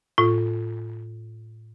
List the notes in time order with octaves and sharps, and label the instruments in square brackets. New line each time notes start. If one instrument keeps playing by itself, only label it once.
[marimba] A2 F4